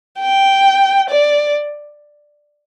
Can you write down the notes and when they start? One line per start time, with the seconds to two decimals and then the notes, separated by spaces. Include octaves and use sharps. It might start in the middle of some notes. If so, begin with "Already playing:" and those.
0.20 G5
1.10 D5